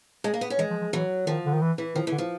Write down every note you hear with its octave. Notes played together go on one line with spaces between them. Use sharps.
G#3
A#3
B3
C#4
E3 G#3
F3
F3
E3 F#3
D#3 F3
D3
D#3
E3
E3
D#3 F3
D3 E3
F3